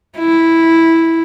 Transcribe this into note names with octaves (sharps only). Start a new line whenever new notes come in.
E4